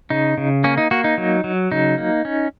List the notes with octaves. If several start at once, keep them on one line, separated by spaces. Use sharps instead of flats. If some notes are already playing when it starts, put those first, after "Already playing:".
C#3 D#4
C#3
A#3 C#4
D#4
A#3 F#4
D#4
F#3
F#3
C#3 D#4
A#3
C#4